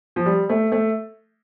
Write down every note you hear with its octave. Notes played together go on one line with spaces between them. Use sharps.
F3
G3
A3
A3